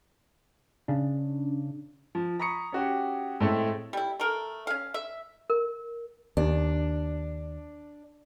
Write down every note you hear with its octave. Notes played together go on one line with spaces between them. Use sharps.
C#3 D4
F3
A#5 B5 C#6 D#6 C#7
C#4 F#4 G4
A2 G#3 A3 C4 E5
G3 E4
A3 A#4
C#4 F5
E5
A#4
D#2 D4